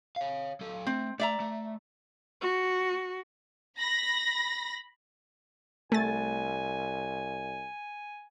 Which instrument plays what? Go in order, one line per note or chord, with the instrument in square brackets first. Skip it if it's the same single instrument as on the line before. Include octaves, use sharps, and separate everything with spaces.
[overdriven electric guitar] C#5 F5
F#3 A4
[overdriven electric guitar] A3 [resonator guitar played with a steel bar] C4
[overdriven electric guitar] A3 [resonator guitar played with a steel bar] D5 E5 A#5
[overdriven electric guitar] A3
[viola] F#4
[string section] B5 A#6
[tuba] C2 [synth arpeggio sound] A3 A6 [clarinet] G#5